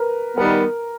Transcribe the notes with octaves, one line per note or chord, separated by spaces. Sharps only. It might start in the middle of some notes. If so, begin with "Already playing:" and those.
Already playing: A#4 B4
D#3 G3 B3 A#4